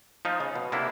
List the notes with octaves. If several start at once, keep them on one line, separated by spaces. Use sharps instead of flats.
F3 D#4 F4
C#3
B2
C3 A#3 D4 E4